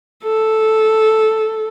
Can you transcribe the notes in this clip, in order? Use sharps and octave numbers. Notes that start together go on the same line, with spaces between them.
A4